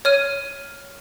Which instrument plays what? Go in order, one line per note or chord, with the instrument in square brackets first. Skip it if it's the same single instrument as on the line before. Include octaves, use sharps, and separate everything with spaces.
[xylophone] C#5 F6 D#7